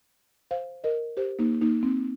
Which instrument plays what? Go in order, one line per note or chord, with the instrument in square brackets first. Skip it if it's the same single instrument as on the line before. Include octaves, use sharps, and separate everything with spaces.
[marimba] C5 F5
A#4 D#5
G4 C5
A#3 D#4
A#3 D#4
C4